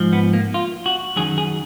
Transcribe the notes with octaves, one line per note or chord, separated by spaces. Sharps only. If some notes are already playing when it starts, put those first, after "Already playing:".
Already playing: G#2 F3
B3
A#3
F4
F#4
F#2 D#3 F#3 G#4
G#4